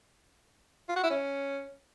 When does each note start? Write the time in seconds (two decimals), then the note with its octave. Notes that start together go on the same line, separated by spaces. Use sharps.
0.89 F4
0.96 F#4
1.03 E4
1.10 C#4